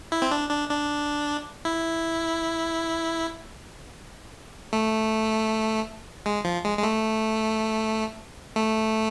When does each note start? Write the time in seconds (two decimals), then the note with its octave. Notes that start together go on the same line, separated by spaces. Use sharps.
0.12 E4
0.22 C4
0.31 D4
0.50 D4
0.70 D4
1.65 E4
4.73 A3
6.26 G#3
6.45 F3
6.64 G#3
6.78 G#3
6.83 A3
8.56 A3